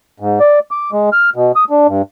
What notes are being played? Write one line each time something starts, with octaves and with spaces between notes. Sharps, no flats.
G#2
D5
D6
G#3
F6
B2
D#6
D4
G2